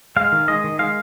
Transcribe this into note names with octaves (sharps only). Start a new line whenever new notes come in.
G#3 F5
D#3
G#3 D#5
D#3
G#3 F5